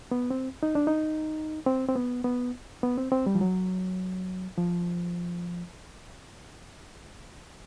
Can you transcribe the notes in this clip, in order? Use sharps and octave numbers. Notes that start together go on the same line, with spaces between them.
B3
C4
D#4
D4
D#4
C4
C4
B3
B3
B3
C4
C4
G3
F3
F#3
F3